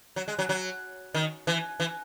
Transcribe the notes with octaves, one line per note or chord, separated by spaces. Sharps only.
F#3
G#3
F#3
F#3
D#3
E3
E3